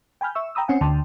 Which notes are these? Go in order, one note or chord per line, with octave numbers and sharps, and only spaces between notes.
G5 G#5 B5 F6 G6
E5 C#6 E6
G5 A#5 B5 D#6 E6
C4 C#4 F#5 G#5
D2 D3 G5 A5 C6